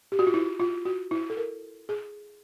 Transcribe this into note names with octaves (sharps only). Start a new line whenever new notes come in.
G4
F#4
F4
E4
F4
F#4
E4
A4
A#4
G#4